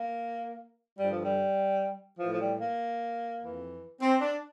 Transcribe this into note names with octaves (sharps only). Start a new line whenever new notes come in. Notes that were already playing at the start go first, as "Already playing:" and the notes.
Already playing: A#3
G2 D3 F3 G3
F3
G3
A2 E3 F3
F3
G3
A#3
F2 E3
C4
D4